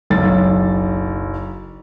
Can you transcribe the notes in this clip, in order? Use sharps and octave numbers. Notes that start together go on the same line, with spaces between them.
F#1 B1 A6